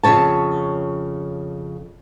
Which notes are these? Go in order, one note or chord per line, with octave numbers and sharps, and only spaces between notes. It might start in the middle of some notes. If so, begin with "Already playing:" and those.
F2 A#2 C#3 C#5 A5